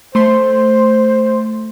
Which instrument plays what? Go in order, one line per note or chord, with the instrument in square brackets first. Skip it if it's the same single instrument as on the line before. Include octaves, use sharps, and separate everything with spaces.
[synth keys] A3 C6 [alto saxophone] C5